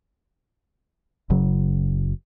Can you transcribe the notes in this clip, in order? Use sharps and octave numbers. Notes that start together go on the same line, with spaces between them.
F#1 C#3 F#3